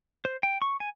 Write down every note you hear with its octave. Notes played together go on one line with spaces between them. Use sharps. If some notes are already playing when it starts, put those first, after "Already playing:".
C5
G5
C#6
G#5